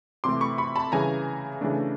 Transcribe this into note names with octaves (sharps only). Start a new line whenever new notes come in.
C3 E3 A3 C6 D6
B5 C#6
B5 C#6
A5 B5
C#3 E3 G3 G#5 A#5
C#3 E3 A3 D4